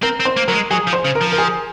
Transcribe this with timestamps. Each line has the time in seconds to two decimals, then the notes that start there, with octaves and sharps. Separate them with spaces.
0.03 C4 A#4
0.20 C4
0.25 C5
0.37 A#3
0.48 F#3 A#4
0.53 G#3
0.71 F#3 G#4
0.87 F3
0.93 C5
1.05 C#3
1.15 A#4
1.21 F3
1.32 A#4
1.38 G#4